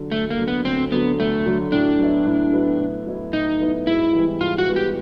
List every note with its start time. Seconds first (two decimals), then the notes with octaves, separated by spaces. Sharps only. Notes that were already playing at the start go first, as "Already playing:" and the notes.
Already playing: D3 F#3
0.12 D2 A3
0.30 A#3
0.38 D3 F#3
0.48 B3
0.65 D2 C4
0.92 D3 F#3 B3
1.19 D2 A3
1.46 D3 F#3
1.72 A2 D4
1.99 F#3 B3 E4
2.26 A2
2.52 F#3 B3 E4
2.80 A2
3.06 F#3 B3 E4
3.33 A2 D#4
3.60 F#3 B3 E4
3.87 G#2 E4
4.13 E3 G3 B3
4.40 G#2 F4
4.58 F#4
4.67 E3 G3 B3
4.76 G4